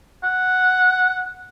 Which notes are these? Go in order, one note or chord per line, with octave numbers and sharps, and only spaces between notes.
F#5